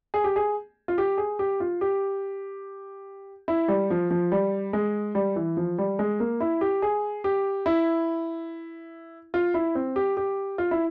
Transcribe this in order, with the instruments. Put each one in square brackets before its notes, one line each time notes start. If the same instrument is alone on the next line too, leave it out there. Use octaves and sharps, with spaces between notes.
[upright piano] G#4
G4
G#4
F4
G4
G#4
G4
F4
G4
E4
G3
F3
F3
G3
G#3
G3
E3
F3
G3
G#3
A#3
E4
G4
G#4
G4
E4
F4
E4
C4
G4
G4
F4
E4